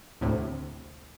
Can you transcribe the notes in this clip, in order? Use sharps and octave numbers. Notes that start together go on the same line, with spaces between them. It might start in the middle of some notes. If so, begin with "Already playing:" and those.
D2 A2 C3